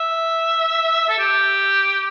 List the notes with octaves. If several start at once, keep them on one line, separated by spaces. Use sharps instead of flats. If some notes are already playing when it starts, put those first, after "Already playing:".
Already playing: E5
A4
G4